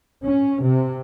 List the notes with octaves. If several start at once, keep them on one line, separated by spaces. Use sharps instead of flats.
C#4
C3